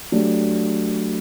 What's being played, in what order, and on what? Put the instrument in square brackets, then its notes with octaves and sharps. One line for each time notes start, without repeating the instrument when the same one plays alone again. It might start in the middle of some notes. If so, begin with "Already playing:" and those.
[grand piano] F#3 A3 D4 G4